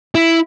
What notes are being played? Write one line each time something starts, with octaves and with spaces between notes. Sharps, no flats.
E4